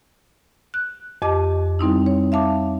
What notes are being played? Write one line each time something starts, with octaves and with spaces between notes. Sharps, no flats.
F#6
F2 G4 D#5 A5 D6
G3 C4 D#4 E4
C#5
E5 F5 A5 D6